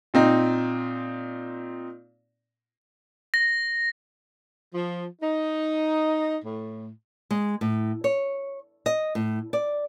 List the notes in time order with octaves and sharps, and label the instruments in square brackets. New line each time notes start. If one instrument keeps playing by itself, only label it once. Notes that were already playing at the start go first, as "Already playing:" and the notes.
[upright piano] A#2 C4 D#4
[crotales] A#6
[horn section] F3
D#4
A2
[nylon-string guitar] G#3
A2
C#5
D#5
A2
D5